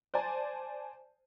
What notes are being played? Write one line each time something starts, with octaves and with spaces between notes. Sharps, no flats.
C5 D5 G#5 A5